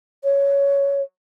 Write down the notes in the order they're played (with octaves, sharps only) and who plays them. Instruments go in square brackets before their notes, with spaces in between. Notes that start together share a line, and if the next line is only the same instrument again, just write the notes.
[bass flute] C#5